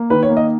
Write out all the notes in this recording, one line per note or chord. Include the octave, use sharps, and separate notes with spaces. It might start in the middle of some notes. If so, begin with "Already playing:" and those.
Already playing: A#3
D#3 B4
C#5
A#3
D#5